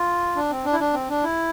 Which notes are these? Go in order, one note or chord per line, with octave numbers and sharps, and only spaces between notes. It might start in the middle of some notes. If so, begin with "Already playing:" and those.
Already playing: F4
D4
C4
D4
E4
D4
C4
D4
E4